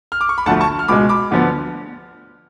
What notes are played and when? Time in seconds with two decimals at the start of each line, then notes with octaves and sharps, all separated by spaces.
0.12 F6
0.21 D6
0.29 C#6
0.38 B5
0.46 D2 D3 F3 A3 F#5 A5
0.61 A5 C#6
0.79 F6
0.88 C#2 B2 G#3 B5 D6
1.09 B5 D6
1.31 D2 D3 F3 B3